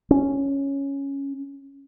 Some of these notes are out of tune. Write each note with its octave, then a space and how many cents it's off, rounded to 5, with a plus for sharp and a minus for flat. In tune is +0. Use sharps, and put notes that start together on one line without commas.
C#4 +0